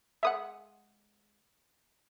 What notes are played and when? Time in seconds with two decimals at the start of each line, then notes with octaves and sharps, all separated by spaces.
0.23 G#3 B4 E5 F#5 D#6